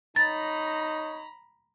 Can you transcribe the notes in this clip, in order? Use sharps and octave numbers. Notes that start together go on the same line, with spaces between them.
D#4 C#5 A#5 B5 A6